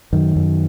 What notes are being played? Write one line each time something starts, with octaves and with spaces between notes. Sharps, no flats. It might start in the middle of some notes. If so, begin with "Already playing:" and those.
F#2 D#3
F#2